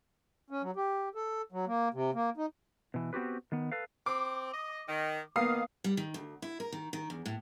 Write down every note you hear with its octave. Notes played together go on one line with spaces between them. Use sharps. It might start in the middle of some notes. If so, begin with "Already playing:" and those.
C#4
F#3
G4
A4
F#3
A#3
C3
A#3
D#4
B2 E3
B3 C4 F#4 G4 B4
D#3 B3
A4 B4 F5
C4 D6
D#5
D#3
D#3 A#3 B3 F5 D#6 C7
G3
D#3
D2
E4
A#4
D#3
D#3
E2
A2